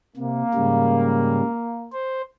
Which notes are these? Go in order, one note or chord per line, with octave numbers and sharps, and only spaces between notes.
C3 A#3
G#2 C#3 G3
C5